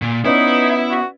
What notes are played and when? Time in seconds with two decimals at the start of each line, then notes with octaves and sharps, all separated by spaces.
0.02 A#2
0.25 B3 C#4 D#4 E4 B4 D5
0.90 F#4